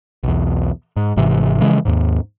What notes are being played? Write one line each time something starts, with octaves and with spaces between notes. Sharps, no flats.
B1 E2
G#2
G#1 G#2 C3 E3
C#3 E3 F3 G#3
D#2 G#2